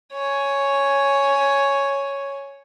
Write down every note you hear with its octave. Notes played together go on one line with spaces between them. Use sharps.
C#5 G#5